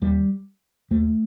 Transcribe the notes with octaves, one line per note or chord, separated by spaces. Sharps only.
D#2 G3
D#2 A3